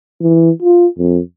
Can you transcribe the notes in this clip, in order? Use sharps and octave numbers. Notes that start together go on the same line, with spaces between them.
E3
F4
F2